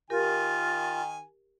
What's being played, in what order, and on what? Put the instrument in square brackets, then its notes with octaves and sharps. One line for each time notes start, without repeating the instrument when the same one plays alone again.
[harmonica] D#3 G#5 [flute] F4 [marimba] G4 A#4